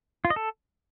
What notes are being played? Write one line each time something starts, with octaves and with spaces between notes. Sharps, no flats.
F4
D#5
A4